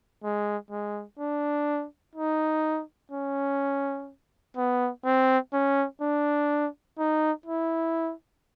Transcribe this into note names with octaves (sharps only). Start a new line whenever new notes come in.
G#3
G#3
D4
D#4
C#4
B3
C4
C#4
D4
D#4
E4